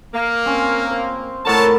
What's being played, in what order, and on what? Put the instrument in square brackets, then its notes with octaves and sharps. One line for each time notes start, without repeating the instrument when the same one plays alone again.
[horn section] A#3
[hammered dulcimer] C4 C#4
C5
[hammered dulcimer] A2 A#4 [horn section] C#5 F#5 A5